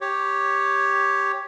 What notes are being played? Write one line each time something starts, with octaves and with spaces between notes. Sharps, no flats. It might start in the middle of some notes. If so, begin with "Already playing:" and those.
G4 C#5